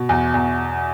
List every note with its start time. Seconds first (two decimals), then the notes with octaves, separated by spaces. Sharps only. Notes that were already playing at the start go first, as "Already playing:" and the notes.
Already playing: B2
0.09 E2
0.34 E2